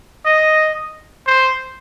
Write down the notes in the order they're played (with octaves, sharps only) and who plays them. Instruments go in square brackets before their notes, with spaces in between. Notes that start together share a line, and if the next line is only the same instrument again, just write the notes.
[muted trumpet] D#5
C5